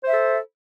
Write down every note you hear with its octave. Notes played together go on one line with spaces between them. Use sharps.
A4 C5 E5